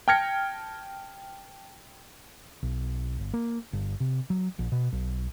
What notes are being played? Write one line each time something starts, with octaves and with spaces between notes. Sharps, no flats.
G5 A5 F6 G#6 A#6 C#7
B1
G1
A#3
G1
C3
F#3
A#1
B2
B1